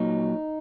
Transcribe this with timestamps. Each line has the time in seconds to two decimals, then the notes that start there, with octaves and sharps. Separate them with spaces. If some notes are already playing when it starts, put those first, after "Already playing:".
Already playing: A#2 F#3 D#4